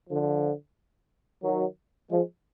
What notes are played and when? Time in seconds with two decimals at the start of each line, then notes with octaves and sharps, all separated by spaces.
0.10 D3 F3
1.44 D#3 F#3
2.10 F3 G#3